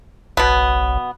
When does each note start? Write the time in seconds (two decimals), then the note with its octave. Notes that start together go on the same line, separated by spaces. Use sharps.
0.37 F#1 B1 B2 B3